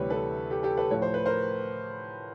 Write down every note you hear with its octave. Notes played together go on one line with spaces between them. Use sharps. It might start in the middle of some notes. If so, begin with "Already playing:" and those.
Already playing: D2 C3 E3 G3 B4 C#5
A4 B4
G4 A4
G4 A4
A4 B4
A2 F3 C#5
C5
B4
A#4 C5